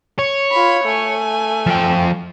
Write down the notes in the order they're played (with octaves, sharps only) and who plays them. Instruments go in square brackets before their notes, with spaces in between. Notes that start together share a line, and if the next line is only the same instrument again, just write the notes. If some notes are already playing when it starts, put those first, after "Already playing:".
[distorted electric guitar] C#5
[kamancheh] F4 B5
A3 G#5
[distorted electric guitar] F3 G5